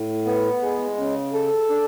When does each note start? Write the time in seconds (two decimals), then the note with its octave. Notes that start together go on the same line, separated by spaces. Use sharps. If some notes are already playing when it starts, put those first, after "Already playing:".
Already playing: A2
0.26 B3
0.61 G#3
0.97 C#3
1.33 A4
1.69 D4